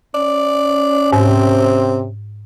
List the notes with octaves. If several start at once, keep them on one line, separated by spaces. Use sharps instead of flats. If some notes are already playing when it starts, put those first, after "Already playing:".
C#4 D5
G#2 C3 C4